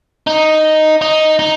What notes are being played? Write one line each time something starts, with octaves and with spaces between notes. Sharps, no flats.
D#4
D#4
D#4